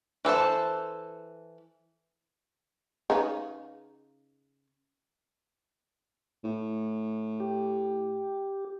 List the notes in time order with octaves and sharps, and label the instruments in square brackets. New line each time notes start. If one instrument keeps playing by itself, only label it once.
[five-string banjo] E3 A4 C5 A5
[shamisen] C#3 D#4 B4
[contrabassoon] A2
[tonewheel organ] G4